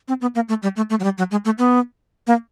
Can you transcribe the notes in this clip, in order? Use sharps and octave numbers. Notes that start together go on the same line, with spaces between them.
C4
B3
A#3
A3
G3
A3
A3
F#3
G3
F#3
G#3
A3
B3
A#3